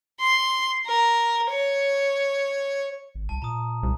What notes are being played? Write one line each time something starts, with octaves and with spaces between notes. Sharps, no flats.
C6
A#4
C#5
G#1
C2 A5
A#2 A#5 D#6
C2